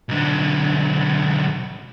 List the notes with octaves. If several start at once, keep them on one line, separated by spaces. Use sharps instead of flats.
B1 D3